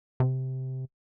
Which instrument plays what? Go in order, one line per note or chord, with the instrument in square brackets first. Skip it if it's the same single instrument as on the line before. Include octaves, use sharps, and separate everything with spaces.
[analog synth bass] C3